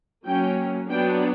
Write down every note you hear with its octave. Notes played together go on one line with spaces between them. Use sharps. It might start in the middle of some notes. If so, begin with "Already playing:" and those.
F#3 A#3 C#4 G5
F#3 B3 D4 G5